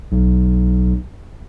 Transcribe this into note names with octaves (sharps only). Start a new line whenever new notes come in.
B1